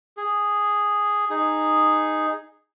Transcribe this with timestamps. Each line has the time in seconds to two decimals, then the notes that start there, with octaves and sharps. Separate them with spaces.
0.17 G#4
1.30 D#4 G#4